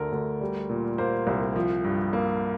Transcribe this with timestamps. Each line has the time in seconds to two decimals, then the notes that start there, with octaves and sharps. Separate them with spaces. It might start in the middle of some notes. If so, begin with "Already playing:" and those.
Already playing: D2 D3 A3 A4 A#4
0.12 D2
0.41 G3
0.69 A#2
0.98 A#3 C5
1.27 C2
1.56 F3
1.84 G2
2.13 A#3